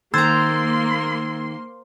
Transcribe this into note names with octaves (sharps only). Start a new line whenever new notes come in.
D#3 A#3 C5 A#5 C6 E6 G#6 A6